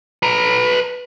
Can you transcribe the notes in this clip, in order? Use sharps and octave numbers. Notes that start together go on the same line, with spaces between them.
B4 A#5